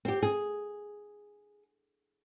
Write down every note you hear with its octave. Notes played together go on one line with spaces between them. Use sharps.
C4 G4
G#4